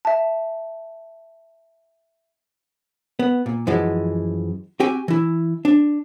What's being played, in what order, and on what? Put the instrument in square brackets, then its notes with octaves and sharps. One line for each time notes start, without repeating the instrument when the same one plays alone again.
[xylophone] E5 A5
[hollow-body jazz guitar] B3
A#2
F#2 E3 F3 G#3
C4 F#4 G4 G5 G#5
E3 E4
D4